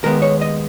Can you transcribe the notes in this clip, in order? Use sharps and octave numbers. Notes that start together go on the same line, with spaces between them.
D#2 D#3 G#3 B3 A#4
C#5
D#5